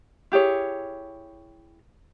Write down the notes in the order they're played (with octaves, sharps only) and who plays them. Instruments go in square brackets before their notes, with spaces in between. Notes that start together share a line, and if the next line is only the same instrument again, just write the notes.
[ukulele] E4 G4 G#4 C#5